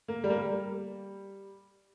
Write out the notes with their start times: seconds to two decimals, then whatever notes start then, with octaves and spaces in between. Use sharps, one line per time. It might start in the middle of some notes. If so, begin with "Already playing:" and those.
0.08 A#3
0.24 G3
0.30 A#3
0.38 G3